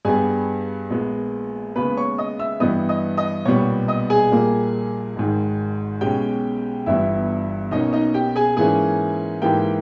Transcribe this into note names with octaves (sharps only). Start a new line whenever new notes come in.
G2 G3 B3 G#4 G#5
A#1 A#2 G#3 B3
D#2 C#3 G#3 B3 B4 B5
C#5 C#6
D#5 D#6
E5 E6
G2 E3 G3 B3 D#5 D#6
D#5 D#6
D#5 D#6
B1 A#2 G3 B3 C#5 C#6
D#5 D#6
G#4 G#5
A#1 A#2 G3 A#3
G#1 G#2 D#3
B1 B2 G#3 C#4 G4 G5
G1 G2 E3 G3 B3 E4 E5
B1 B2 A#3 C#4 D#4 D#5
D#4 D#5
G4 G5
G#4 G#5
G#2 E3 A#3 C#4 G#4 G#5
G#2 E3 A#3 G4 G5